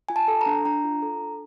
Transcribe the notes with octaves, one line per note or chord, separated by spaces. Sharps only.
F4 G#5
A5
A4
A#5
D4
D4 A#5
F4
A4
D4